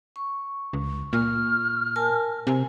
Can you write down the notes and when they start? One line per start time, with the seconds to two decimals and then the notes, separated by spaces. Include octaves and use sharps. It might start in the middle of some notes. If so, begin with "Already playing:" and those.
0.16 C#6
0.73 C#2
1.13 A#2 F6
1.96 A#4 G#5 A5
2.47 C3 G#5